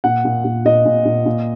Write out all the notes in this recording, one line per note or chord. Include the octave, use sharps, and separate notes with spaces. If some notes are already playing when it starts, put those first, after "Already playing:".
A#2 F#5
A#2
A#2
A#2 D#5
A#2
A#2
A#2